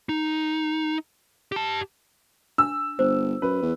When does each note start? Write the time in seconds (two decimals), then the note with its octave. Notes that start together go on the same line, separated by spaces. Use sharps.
0.09 D#4
1.52 G4 A5
2.58 D4 E6
2.99 G1 C5
3.42 F#2 B4
3.62 E2